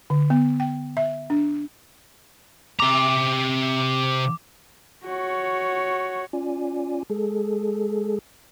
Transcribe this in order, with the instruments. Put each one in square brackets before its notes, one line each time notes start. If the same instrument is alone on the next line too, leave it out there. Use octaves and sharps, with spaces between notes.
[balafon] D3
B3
G5
E5
D4
[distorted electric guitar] C3 A#5 [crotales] D6
[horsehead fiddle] F#4 C#5
[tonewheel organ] C#4 F4 D5 G#5
G#3 G#4 A4